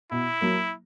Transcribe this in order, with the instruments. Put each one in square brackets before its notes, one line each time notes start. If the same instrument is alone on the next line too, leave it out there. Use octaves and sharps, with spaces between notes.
[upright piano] B2 [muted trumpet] E4
[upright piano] F#3 A#3